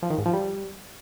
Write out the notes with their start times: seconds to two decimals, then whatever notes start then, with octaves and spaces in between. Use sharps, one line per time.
0.03 F3
0.10 D#3
0.18 G#2
0.26 F3
0.33 G3